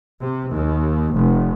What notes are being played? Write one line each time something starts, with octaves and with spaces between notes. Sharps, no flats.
C3
D#2
F1